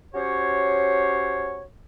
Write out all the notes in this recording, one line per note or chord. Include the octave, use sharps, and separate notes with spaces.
C#4 F#4 G4 C5 C#5